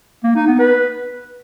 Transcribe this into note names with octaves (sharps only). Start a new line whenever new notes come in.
A#3
D#4
B3
B4